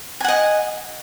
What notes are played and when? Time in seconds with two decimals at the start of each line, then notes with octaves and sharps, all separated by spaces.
0.20 G#5
0.24 F#5
0.28 D#5